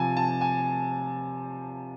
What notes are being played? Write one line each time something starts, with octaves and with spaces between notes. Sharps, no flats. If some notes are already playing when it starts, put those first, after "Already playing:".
Already playing: C3 F3 G#5 A5
A5
G#5